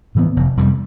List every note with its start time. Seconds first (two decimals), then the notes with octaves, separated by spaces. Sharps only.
0.15 A2 E3 B3
0.36 F1
0.57 F2 C3 G3